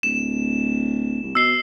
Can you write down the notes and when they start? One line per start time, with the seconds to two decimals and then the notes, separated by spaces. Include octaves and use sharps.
0.03 D1 E7
1.22 C2
1.35 B2 E6 C7 G7